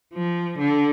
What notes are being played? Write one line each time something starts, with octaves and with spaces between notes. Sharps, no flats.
F3
D3